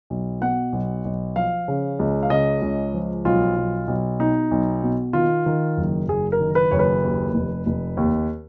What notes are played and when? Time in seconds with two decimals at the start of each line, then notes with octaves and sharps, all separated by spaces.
0.10 B1
0.41 B2 F#5
0.72 B1
1.05 B1
1.36 F3 F5
1.68 C#3
1.99 C#2
2.23 F5
2.30 C#3 D#5
2.62 C#2
2.94 F3
3.25 B1 F4
3.56 B1
3.88 B1
4.20 B2 D#4
4.51 B1
4.83 B2
5.13 D#3 F4
5.46 D#3
5.77 F#1
6.08 F#1 G#4
6.32 A#4
6.40 D#3
6.55 B4
6.71 F#1 C#5
6.79 B4
7.03 D#2
7.34 F1
7.66 F1
7.97 D#2